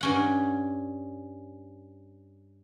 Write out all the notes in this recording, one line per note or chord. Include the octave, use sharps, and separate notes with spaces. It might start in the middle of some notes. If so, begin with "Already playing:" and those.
G2 C#4 F#5